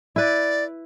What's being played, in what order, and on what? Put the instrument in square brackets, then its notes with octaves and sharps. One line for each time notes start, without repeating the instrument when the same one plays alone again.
[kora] E4 B4 [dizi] D5